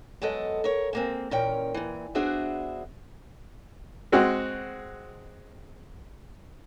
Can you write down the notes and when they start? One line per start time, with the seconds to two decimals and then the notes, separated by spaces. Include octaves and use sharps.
0.22 F#3 G#3 B3 A4 D#5
0.64 A#4 C#5
0.93 G#3 A#3 C4
1.31 A#2 E3 C#4 A#4 G5
1.74 A#2 E3
2.15 B3 D4 F#4 G#4 C5 E5
4.12 G#3 C4 F#4